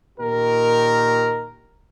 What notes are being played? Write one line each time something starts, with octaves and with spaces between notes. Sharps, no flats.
A#2 D#3 G4 A#4